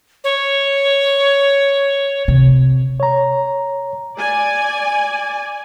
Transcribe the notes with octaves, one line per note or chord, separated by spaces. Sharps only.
C#5
C3
C#5 A#5
D5 G#5